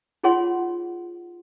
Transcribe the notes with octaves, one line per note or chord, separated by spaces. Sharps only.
D#4 F4 G#4 C#5 F#5 C6